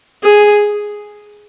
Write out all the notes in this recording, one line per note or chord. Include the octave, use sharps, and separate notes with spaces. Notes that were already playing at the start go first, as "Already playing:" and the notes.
G#4